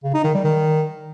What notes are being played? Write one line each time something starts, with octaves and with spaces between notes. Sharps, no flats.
C#3
D#4
D#3
G3
D#3